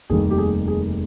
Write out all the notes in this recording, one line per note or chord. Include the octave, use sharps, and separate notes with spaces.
F1 D#2 D#3 G3 G#4
G4
G#4
G#4